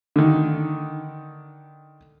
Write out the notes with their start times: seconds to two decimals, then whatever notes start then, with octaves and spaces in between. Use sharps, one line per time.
0.16 D3 D#3